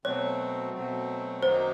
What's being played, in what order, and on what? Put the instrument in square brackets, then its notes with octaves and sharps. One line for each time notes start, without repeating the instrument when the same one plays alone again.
[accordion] B2 F#3 A3 C4 [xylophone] C#5
[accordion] B2 F#3 A3 C4
[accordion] F#2 D#3 F#3 A#3 D#4 [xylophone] C5